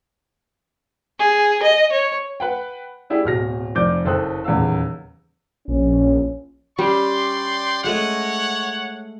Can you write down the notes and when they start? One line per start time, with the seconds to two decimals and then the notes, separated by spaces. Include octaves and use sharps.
1.19 G#4
1.62 D#5
1.92 C#5
2.40 B4 F#5 G5
3.10 D4 E4 G4 G#4
3.24 D1 B2 F6 A#6
3.75 F1 F2 D5 D6 G6
4.05 F#1 A4 C5 G5 D#6 F#6
4.44 D#1 E2 C#3 F5 E6
5.68 A#1 C#4
6.79 G3 C#4 D5 G5 C6
7.84 G#3 A3 C#5 D#5 F#5